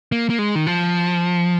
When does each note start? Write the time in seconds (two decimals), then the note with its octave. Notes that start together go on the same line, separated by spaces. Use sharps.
0.12 A#3
0.30 A#3
0.39 G#3
0.55 D#3
0.67 F3